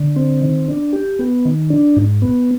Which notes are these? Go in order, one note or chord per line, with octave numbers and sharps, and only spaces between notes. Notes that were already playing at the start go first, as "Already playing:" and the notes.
Already playing: D3
C4
D#3
D4
G4
B3
D#3
D4
G#2
B3